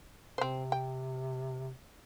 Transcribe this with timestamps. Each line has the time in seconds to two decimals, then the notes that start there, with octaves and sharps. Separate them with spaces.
0.38 C3 C4 C5
0.72 G5